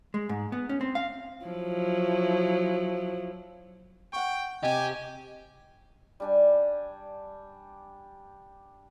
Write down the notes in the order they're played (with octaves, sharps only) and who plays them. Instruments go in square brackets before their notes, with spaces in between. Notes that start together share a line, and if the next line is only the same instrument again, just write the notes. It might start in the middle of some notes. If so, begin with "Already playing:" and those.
[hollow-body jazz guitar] G#3
G#2
B3
C#4
C4
F5
[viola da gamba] F3 F#3 E4
[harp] F#5 C#6 [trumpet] G5
[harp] C3 [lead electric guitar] G4 [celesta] D#5 [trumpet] G#5
[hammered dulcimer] G3 D4 G#5